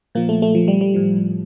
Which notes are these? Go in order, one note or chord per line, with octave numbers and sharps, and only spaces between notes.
A#2 F3 A#3
A3
A3
F3
G3
G3
A2 F3